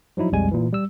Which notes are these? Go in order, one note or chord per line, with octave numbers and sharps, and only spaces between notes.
F3 F#3 D#4 E4
B1 F2 G3 G#3 G#5
A#2 E3
G3 E6